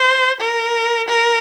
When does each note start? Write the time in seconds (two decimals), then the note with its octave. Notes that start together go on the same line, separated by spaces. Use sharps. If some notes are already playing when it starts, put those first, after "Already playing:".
Already playing: C5
0.41 A#4
1.09 A#4